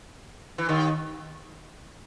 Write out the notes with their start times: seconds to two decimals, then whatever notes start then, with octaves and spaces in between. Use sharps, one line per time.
0.58 E3
0.69 D#2 D#3